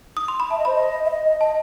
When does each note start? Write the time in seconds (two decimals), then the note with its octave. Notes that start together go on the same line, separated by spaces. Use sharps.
0.17 D#6
0.28 C6
0.40 B5
0.51 E5 A5
0.58 D#5
0.65 C5 B5
0.75 D#5
1.05 E5
1.10 D#5
1.26 D#5
1.41 D#5 A5